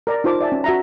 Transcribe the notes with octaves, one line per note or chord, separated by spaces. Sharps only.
A#4 D5 A#5
D#4 F4 C5 A5 D6
D5 E5 G#5 A5
C#4
F#4 E5 A#5